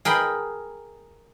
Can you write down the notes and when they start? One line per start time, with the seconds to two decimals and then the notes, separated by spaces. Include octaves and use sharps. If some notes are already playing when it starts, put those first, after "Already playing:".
0.05 G#4 A#4 G5 B5